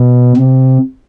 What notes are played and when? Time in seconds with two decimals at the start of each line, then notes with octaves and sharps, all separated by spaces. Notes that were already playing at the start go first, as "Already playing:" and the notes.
Already playing: B2
0.37 C3